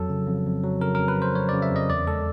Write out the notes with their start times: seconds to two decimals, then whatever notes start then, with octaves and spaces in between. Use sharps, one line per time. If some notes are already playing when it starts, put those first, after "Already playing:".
Already playing: F2 F#3 A4
0.10 C#3
0.27 F2
0.46 F2
0.63 F#3
0.81 C#3 A#4
0.95 F2 A#4
1.08 B4
1.18 F2 C5
1.35 F#3 C#5
1.49 C#3 D5
1.62 E5
1.72 F2 D#5
1.90 E2 D5
2.07 G#3 A4